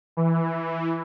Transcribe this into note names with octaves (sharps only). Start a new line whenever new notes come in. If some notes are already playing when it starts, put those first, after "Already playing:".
E3